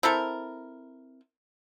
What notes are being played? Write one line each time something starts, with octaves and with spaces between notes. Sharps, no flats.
C4 E4 A4 A#4